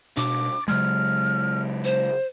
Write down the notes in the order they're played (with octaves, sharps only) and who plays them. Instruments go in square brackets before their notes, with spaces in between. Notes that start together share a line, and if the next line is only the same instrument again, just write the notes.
[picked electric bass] B2 D4 [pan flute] D6
[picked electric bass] C#3 F#3 G#3 [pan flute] F6
[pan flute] C5